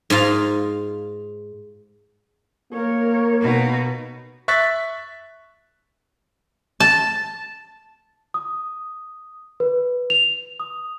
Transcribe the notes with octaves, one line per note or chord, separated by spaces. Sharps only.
G#2 D#4 F4 F5
A#3 A#4 C#5
B2 D#4
E5 C#6 F#6 A6 B6
A5
D#6
B4
F7
D#6